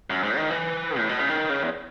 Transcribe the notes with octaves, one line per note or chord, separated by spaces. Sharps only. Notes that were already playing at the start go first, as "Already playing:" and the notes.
F#2
G#2
D#3
E3
A2
B2
C#3
D#3
C#3
E2